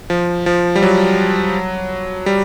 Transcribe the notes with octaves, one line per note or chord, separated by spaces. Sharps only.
F3
F3
G3
F#3
G3